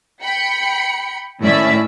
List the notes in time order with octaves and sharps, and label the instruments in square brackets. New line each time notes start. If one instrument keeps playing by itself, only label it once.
[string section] G5 B5 C#7
A2 D#3 C#4 E4 D5 E5